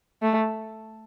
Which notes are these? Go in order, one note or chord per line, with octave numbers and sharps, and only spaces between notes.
A3